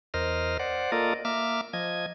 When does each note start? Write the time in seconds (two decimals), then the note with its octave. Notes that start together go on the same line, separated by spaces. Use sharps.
0.14 E2 A#4 C5 D#5 F6
0.60 C5 D5 F#5
0.92 A#3 F4 A4 A#4 D5 D#5
1.25 A#3 E5 D6 F6
1.73 F3 D#5 G#6